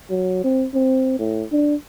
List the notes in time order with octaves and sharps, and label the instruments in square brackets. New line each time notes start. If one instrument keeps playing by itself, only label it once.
[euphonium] F#3
C4
C4
A2
D4